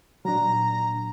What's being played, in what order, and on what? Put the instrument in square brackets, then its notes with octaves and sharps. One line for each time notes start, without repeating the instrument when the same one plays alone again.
[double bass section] A#2 [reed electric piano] F#3 D4 [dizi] A#5